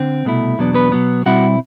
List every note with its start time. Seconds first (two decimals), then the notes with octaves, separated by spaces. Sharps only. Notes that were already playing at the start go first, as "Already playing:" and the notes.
Already playing: D3 C4
0.25 C2 B2 A3 E4
0.59 E2 B2 F#3 B3 D4
0.74 B3 B4
0.92 B2 F#3 B3
1.26 B2 G3 C4 E4 F#4 F#5